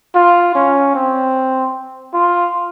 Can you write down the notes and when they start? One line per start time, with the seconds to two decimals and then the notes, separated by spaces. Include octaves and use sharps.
0.15 F4
0.55 C#4
0.95 C4
2.14 F4